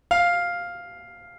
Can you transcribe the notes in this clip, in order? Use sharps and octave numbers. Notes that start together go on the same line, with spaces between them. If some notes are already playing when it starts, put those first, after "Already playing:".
F5